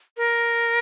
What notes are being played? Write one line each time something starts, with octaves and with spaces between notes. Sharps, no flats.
A#4